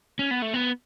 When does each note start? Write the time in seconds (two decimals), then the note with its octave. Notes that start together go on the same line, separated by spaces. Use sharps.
0.19 C#4
0.31 B3
0.42 A3
0.54 B3